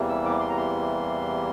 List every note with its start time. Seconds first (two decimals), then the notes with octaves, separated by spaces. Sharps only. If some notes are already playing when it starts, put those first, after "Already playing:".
Already playing: E2 C3 E3 G3 A#3
0.09 E6
0.25 D6
0.40 C6
0.49 A#5
0.57 C6